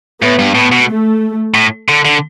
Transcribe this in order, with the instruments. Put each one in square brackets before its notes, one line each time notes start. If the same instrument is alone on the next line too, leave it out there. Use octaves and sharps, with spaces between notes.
[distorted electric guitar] A2 [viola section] B3
[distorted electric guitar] G2
[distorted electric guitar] A2 [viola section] B3
[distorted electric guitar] B2
[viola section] A3
[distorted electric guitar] A2
D3
D3